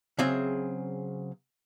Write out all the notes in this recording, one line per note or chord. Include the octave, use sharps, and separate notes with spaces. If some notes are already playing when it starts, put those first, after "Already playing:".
C#3 F#3 C4 G#4 E5